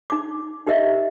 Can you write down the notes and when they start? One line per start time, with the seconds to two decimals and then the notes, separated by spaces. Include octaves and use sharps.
0.10 D#4 D6
0.66 D#4 G4 A#4 D#5 E5